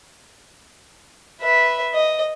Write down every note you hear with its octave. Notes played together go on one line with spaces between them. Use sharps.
B4 E5
D#5